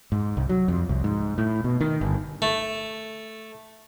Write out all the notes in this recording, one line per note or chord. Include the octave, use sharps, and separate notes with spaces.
G#2
C2
F#3
F2
C2
G#2
A2
B2
D#3
G1
A3